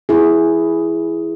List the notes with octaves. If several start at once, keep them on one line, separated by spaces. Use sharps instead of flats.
E4 G#4